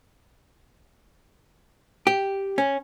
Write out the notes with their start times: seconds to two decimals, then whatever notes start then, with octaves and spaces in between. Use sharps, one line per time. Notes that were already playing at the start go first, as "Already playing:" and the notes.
2.07 G4
2.58 C#4